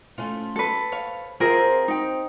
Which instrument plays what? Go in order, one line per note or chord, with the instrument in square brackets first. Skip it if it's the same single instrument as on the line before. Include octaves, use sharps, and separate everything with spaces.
[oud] A3 C#4 F4
[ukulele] A4 B4
[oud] C#5 F5
[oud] C4 E5 [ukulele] F4 G#4 A#4
[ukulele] D#4 G5